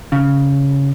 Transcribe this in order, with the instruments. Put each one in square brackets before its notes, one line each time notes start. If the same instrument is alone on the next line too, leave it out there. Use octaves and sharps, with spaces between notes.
[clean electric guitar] C#3